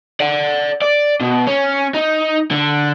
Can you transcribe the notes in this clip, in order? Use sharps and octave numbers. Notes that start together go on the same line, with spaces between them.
D5 F#5
D5
B2
C#4
D#4
D3